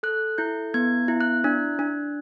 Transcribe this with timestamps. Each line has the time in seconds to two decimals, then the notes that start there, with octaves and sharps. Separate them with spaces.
0.03 A4 F#6
0.38 E4 G6
0.74 B3 G#6
1.08 E4
1.21 F#6
1.44 D4
1.79 D4